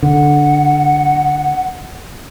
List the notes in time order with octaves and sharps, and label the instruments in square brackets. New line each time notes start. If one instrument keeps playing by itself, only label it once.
[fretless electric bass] D3 [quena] F#5